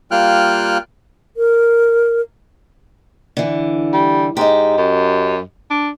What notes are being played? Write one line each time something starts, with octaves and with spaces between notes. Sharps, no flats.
G3 A#3 F4 G5 F6 F#6
A#4
D3 E3
G3
G#2 G4 D#5
F#2
D4